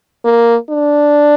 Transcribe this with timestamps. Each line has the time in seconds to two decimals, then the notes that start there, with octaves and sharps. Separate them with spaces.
0.25 A#3
0.70 D4